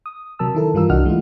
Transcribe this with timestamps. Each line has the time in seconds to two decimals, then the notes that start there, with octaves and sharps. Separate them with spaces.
0.06 D#6
0.39 C3 F#3 A#4 A5 E6
0.55 D#3 E4 A4 A#4
0.74 G2 E3 G3 F4 A#4 E6
0.89 C2 D4 F#4 D#5 F#5 F6
1.05 E3 G#3 A3 E4 F4